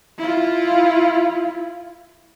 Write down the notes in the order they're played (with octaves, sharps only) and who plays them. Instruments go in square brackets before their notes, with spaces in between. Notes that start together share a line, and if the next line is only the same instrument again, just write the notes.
[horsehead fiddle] E4 F4